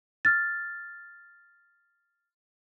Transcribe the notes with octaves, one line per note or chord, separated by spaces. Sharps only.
F6 A6